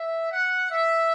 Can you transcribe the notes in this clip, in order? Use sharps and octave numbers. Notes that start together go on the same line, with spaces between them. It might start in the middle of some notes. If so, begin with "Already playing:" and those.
Already playing: E5
F#5
E5